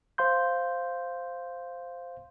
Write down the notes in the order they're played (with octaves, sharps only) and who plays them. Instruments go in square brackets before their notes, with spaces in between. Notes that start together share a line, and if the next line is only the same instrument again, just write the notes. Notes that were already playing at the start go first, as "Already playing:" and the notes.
[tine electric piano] C5 F5 C6 G6